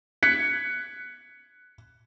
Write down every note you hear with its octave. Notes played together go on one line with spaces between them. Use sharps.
F#6 G#6 B6 C#7